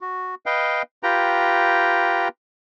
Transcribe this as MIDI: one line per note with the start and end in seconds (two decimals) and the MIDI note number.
0.01 0.35 66
0.46 0.82 71
0.46 0.82 75
0.46 0.82 77
0.46 0.82 79
1.03 2.28 65
1.03 2.28 67
1.03 2.28 71
1.03 2.28 79
1.03 2.28 82